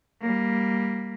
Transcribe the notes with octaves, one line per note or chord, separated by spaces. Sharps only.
G3 A#3